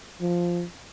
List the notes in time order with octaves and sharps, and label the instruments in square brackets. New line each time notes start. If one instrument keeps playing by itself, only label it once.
[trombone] F3